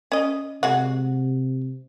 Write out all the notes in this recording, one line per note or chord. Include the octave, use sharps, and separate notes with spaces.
C#4 D#5
C3 G#3 F#4 F#5